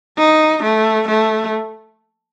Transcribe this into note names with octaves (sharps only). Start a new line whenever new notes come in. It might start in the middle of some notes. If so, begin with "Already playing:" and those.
D#4
A3
A3